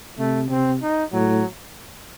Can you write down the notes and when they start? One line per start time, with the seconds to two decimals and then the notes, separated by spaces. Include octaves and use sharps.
0.19 C3 A3
0.50 C3 C4
0.82 D#4
1.13 A2 F#3